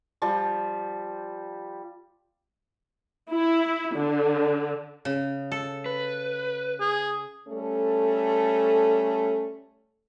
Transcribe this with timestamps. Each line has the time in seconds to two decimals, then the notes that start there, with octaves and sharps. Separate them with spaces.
0.22 F3 G3
3.31 E4
3.95 D3
5.05 C#3
5.52 A4
5.86 B4
6.80 G#4
7.48 G3 A3 C#4 A4